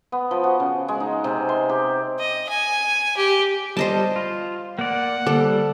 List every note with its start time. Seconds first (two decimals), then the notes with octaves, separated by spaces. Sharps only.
0.12 B3
0.31 F3
0.44 F#4
0.60 C#3
0.88 G#3
1.00 D#4
1.24 C3
1.49 C6
1.69 G4
2.19 D#5
2.49 G#5
3.17 G4
3.77 G3 C5 D#5 A5
4.16 F4
4.79 A#3 D5 F#5
5.27 D3 G3 A#3 A4